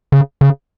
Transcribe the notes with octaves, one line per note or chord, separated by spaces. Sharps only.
C#3
C#3